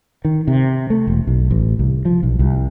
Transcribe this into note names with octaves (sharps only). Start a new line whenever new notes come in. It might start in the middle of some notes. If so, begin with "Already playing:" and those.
D#3
C3
A3
E1
B1
A1
C2
F3
B1
C2